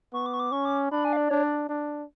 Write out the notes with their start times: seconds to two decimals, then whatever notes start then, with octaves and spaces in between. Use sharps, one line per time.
0.13 B3 C#6
0.26 D6
0.34 C#6
0.40 D6
0.52 C#4 C#6
0.65 D6
0.91 D4 B5
1.05 G#5
1.13 F5
1.17 D5
1.30 D4 C#5
1.43 D5
1.69 D4